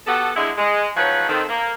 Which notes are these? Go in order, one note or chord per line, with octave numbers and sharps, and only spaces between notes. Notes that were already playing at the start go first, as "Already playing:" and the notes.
B3 F#4 G4 A4
D3 G#3 E4
G#3
G#2 F3 F#3 B4 C#5 F#5
D#3 C4 A4
A#3